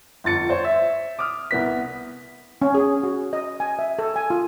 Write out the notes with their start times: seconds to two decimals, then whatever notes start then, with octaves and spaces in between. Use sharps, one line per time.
0.24 G1 F2 A6 C#7
0.50 C5 C#5
0.64 E5
1.19 D6 D#6 F6
1.51 C2 B3 B6
2.62 C#4
2.75 G#4
3.03 F#4
3.33 D#5
3.60 G#5
3.79 E5
3.99 A4
4.16 G#5
4.30 F4